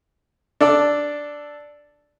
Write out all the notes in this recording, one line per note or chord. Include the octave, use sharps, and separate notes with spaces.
D4 A4 D5